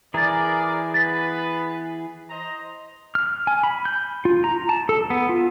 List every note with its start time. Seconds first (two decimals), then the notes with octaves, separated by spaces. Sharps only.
0.14 E3 G#4 A#4 D5 A#5 A6
0.94 B3 B4 A6 B6
2.30 C5 D#5 A#5
3.15 F6
3.47 G#5
3.63 B5
3.85 G6
4.25 F4
4.44 A#5
4.69 A5
4.89 A4
5.10 B3
5.29 F4